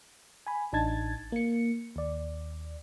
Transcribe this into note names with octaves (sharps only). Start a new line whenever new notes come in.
G#5 B5
A1 D4 D#4 A5 G#6 A6
A#3 C#7
D#2 D5